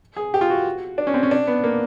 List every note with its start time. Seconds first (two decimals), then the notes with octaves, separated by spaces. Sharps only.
0.17 G#4
0.34 G4
0.41 F4
0.50 F#4
0.98 D4
1.07 C#4
1.14 C4
1.23 C#4
1.31 D4
1.47 B3
1.64 A#3